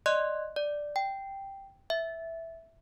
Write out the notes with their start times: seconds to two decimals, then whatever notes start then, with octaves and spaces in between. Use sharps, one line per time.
0.06 D5 D#5 C6 F#6
0.56 D5
0.96 G5
1.90 E5